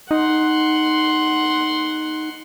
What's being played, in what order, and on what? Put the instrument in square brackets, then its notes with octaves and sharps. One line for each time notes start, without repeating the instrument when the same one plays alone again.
[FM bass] D#4 [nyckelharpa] F#5 C6